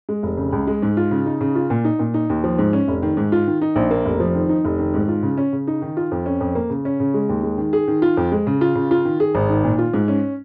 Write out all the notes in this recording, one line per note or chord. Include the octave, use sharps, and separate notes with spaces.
G#3
F1
C#3
C#2
G#3
G#2
F4
C#3
D#4
C#3
F4
A#2
D#4
A#2
D#4
D#2
F3
G#2
C#4
F1
D#3
G#2
F4
D#3
D#4
A#1
A#3
F1
F3
D#3
D#4
F1
D#3
G#2
F4
C#3
C#4
C#3
D#4
D#3
F4
F2
C#4
F2
A#3
C#3
C#4
C#3
G#3
D#2
G#3
D#3
G#4
D#3
F4
F2
G#3
C#3
F4
C#3
F4
D#3
G#4
G#1
D#3
A#2
F4
G#2
C#4